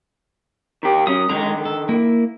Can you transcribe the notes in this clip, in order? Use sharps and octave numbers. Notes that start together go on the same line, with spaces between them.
D#3 G4
F#3 C#4 D#6
D3 D#3 G#3 A#5
A4
A#3 E4